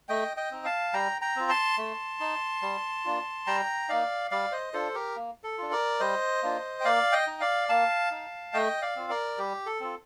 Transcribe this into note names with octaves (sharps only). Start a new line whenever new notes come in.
A3 D#5 G5
D#5 G5
C4 D#4
F5 A5
G3 G5 A#5
G5 A#5
C4 F4
A5 C6
A3
D#4
G3
A#3 D4 F4
G3 G5 A#5
A#3 D#4 D5 F5
G3 D5 F5
C5 D#5
D4 F4 A4 C5
G4 A#4
A#3
A4
D4 F4
A#4 D5
G3 C5 D#5
A#3 D4 F4
G5
A#3 D5 F5
D#5 G5
D#4
D5 F5
A#3 F5 A5
D#4
A3 D#5 G5
D5 F5
C4 F4
A#4 D5
G3 G4
A4
C4 F4